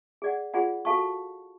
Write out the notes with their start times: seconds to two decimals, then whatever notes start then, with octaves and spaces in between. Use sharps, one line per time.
0.22 G#4 D5 F#5
0.54 F4 G#4 D5 F#5 B5
0.85 F#4 A4 F5 A5 C#6